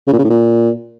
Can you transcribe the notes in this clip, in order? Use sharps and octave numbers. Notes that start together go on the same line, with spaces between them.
C#3
A#2
C#3
A2
A#2